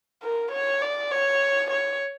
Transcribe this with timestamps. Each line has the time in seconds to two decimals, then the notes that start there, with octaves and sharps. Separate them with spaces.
0.23 A#4
0.52 C#5
0.82 D5
1.12 C#5
1.71 C#5